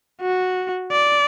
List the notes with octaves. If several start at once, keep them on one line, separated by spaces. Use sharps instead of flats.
F#4
D5